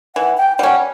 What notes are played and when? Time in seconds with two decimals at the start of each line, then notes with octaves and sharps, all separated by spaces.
0.15 E3 F#5
0.37 G5
0.59 G3 C#4 F#5